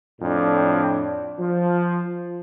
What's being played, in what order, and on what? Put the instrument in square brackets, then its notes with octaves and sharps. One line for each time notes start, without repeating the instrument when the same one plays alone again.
[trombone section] F2 A2 D4
F3